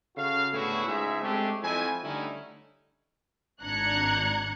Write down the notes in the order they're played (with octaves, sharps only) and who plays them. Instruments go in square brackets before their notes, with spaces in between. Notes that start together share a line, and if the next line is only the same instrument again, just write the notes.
[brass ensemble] C#3 F#4 A4 F5
A2 D3 B3 E4 F#4 G#4
C#2 G#2 G#4 E5
G#3 A3 C4 D4 G4 G#4
F2 E4 G#5
D3 G3 A3 C#4 D#4 E4
[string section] G#1 D4 A#5 F#6 G#6 C#7